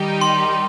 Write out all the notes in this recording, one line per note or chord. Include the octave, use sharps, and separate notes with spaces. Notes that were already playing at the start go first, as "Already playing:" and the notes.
Already playing: D#3 G3 D#4 G4
C6